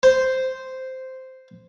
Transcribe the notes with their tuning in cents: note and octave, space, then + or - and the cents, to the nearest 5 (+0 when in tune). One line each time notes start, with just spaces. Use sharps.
C5 -5